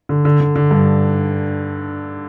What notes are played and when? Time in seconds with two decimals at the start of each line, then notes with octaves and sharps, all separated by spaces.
0.09 D3
0.25 D3
0.40 D3
0.56 D3
0.71 G2